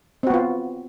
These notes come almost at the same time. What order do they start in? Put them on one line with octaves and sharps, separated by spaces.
C4 F#4 B3 F4